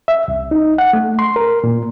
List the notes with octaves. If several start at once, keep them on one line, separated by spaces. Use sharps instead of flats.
E5
C2
D#4
F#5
A3
C6
A#4
A#2